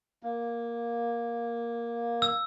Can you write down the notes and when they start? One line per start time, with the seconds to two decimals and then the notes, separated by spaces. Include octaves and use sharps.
0.23 A#3
2.22 E6